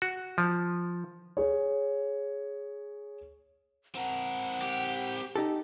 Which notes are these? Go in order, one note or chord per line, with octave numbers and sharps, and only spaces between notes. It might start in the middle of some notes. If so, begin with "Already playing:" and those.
F#4
F3
G#4 C#5
C4 A#4 F#5
G4
D#4 G4 A4